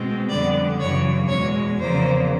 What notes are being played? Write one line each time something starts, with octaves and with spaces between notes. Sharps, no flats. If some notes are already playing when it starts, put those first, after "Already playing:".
Already playing: B2 G#3 C4
F2 D3 G3 B3 D5
F#2 C#3 E3 C#5
E2 B2 G#3 C#5
E2 C#3 F3 A#3 C5